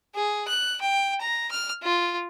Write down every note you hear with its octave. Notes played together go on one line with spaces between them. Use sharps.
G#4
F#6
G5
A#5
F6
F4